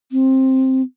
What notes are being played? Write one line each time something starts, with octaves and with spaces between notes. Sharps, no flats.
C4